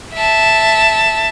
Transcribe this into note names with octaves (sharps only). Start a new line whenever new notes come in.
E5 A5